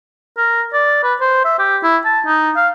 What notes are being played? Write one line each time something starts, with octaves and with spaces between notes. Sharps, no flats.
A#4
D5
B4
C5
E5
G4
E4
A5
D#4
F5